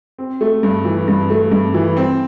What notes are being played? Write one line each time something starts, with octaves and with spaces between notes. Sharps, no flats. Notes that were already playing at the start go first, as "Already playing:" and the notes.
C4
A3
G2
E3
G2
A3
G2
E3
C4